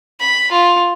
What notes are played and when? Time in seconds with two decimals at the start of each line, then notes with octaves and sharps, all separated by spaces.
0.20 B5
0.52 F4